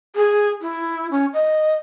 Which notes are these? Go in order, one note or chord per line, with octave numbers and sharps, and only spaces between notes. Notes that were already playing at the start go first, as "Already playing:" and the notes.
G#4
E4
C#4
D#5